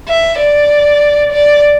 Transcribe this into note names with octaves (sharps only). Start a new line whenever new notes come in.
E5
D5
D5